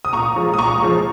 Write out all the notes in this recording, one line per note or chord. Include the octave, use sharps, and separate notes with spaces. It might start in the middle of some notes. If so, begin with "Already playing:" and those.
D#6
A#2 A#5 C#6
F3 G#3
D#6
A#2 A#5 C#6
F3 G#3